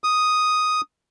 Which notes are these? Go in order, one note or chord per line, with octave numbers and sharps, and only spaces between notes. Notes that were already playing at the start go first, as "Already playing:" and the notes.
D#6